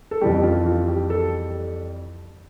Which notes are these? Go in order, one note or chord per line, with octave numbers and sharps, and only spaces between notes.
A4
F2 E3 G3 G4
G4
F4
F4
G4
A4